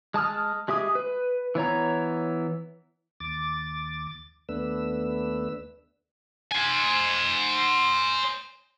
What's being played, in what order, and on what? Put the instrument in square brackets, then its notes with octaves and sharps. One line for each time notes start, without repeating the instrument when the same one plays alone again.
[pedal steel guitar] G#3 A5 D#6 F6
G#3 G4 E5 D#6
B4
E3 B3 C#5 A#5
[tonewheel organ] D#2 D6 A6
D#2 A3 B3 D4 B4 E6
[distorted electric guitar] C5 G#5